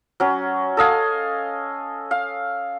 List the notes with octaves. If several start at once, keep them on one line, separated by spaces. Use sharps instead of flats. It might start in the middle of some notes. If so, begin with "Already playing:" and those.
F#3 C#4
A4 D#5 F5 G#5
F5